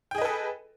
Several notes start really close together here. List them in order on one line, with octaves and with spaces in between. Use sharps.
G5 G#4 D#5 B4 A4